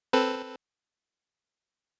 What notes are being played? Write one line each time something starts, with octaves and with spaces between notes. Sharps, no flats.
C4 A4 B4